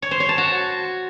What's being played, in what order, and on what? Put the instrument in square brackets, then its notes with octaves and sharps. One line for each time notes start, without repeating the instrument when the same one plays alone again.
[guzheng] C#5
C5
C#5
A5
F#4